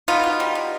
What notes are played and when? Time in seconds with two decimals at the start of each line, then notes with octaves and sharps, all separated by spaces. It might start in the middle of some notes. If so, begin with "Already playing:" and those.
0.08 B3 D#4 F4
0.24 B2
0.40 G3
0.55 B2